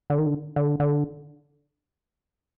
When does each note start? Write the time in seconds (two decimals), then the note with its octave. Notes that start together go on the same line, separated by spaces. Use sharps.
0.10 D3
0.18 D#3
0.26 D3
0.56 D3
0.80 D3